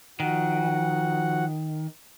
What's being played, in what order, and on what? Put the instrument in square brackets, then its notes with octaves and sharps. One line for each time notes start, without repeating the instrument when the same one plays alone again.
[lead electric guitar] D#3 [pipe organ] F3 F#4 F#5